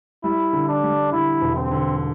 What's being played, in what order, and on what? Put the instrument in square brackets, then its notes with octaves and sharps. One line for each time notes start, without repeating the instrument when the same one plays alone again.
[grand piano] G3 [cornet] E4
[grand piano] D3
[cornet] D4
[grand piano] G3
[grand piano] D3 [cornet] E4
[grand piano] E1
[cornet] C4
[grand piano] D3